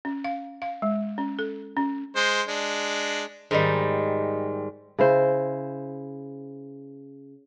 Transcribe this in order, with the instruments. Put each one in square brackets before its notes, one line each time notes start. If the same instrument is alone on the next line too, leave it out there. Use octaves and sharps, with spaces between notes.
[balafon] C#4
F5
F5
G#3
C#4
A4
C#4
[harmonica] G#3 C5
G#3 D4
[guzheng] G#2 D#3 G3
[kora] C#3 E4 C5